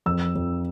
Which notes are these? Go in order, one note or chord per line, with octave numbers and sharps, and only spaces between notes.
F2 E6
F2